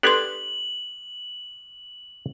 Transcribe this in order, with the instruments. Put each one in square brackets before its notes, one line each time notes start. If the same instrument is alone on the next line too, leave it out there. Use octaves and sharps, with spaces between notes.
[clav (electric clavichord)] B3 D4 G4 [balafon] A4 B4 C6 [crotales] F#7